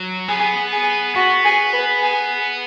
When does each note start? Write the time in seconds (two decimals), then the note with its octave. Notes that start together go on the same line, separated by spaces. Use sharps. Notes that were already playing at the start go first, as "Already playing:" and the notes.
Already playing: F#3
0.28 B3 G#4
0.72 G#4
1.16 B3 F#4
1.45 G#4
1.73 B4
2.02 G#4